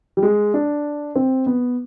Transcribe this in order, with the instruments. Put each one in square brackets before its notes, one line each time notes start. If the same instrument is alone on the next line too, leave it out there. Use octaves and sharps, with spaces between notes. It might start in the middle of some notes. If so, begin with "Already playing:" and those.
[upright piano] G3
G#3
D4
C4
B3